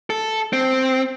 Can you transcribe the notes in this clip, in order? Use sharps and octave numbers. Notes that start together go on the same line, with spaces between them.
A4
C4